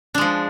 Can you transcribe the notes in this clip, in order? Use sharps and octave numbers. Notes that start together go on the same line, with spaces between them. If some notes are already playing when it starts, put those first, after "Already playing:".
F3 G#3 D4